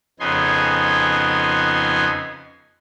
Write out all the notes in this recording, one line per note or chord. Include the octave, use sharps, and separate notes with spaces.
F2 C#3 B3 D#4 G#5 C6